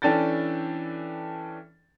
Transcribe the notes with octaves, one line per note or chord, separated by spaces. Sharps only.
E3 C#4 D4 A4 G5 A6